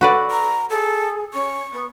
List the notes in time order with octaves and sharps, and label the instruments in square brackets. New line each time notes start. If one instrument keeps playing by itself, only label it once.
[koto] F#4 B4 D5 [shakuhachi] A4
[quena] A#5
[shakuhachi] G#4 [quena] A4
[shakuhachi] C#4 [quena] C#6
[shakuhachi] B3